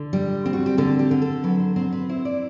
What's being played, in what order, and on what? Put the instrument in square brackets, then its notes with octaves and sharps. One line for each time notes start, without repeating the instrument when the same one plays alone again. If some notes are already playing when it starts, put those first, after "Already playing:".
Already playing: [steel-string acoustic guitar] D3
G3
C4
F#4
G4
D3 A4
G4
D3
A4
F#3 B4
C5
C4 C5
B4
E4 C5
D5